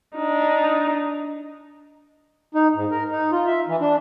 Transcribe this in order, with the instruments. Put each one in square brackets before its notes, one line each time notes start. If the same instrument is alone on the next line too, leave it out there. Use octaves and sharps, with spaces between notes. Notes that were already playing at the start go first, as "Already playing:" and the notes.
[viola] D4 D#4
[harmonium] D#4
G#2
A#4
D#4
F4
E5
E3
D4